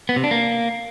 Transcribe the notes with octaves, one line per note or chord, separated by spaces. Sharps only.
B3
C3
D4
A#3